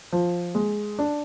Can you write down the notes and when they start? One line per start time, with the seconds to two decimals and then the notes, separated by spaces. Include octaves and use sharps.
0.12 F3
0.55 G#3
0.99 D4